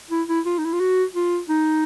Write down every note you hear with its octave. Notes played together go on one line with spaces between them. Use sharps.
E4
E4
F4
D#4
E4
F4
F#4
F4
D#4